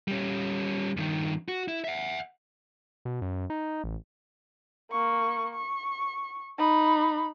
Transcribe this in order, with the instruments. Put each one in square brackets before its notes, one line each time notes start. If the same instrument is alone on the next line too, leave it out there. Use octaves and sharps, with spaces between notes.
[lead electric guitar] G3 C#4
G2 D#3
F#4
E4
E5 F#5
[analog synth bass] B2
F#2
D#4
A1
[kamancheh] A#3 C#6
C#6
D#4 B5